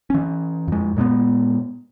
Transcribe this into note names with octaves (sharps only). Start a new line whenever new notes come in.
E3 C#4
F2 G#3
A#2 G#3 A#3 B3